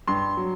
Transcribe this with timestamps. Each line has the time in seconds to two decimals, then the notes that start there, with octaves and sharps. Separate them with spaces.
0.07 G2 C6
0.37 F#3